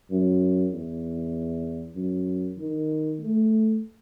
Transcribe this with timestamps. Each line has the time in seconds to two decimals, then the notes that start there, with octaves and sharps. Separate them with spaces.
0.10 F#2
0.72 E2
1.95 F#2
2.58 D#3
3.19 A3